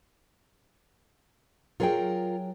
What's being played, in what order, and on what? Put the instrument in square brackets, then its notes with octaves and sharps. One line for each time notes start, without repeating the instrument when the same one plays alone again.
[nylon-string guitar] F#3 G#4 G5 [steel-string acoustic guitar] F4 A#4